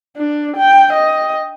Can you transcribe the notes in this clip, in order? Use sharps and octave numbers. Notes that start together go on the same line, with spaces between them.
D4
G5
D#5